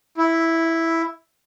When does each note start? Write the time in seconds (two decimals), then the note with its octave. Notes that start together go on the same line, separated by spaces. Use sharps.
0.17 E4